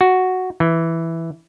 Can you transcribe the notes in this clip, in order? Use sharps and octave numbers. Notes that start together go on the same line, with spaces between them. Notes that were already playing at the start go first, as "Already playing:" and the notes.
F#4
E3